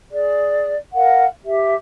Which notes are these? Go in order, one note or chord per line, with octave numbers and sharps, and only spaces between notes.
G#4 D5
A#4 F5 F#5
G4 E5